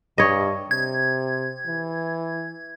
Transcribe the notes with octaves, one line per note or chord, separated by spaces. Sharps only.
G2 C#5 D#5
C3 G#6
E3